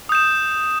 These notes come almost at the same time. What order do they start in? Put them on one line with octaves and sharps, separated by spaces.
D#6 G6 E7